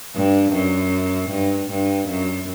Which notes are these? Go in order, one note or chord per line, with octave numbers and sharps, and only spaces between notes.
G2
F#2
G2
G2
F#2